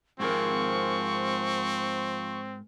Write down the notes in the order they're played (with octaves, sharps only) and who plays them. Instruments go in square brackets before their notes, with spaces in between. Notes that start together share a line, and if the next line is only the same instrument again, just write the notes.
[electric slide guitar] G#2 G#4 A#4 [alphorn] F3 [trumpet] C4 [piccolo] C#6